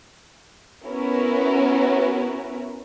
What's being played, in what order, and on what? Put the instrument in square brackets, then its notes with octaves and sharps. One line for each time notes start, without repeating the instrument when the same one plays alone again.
[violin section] B3 C#4 E4 F#4 A#4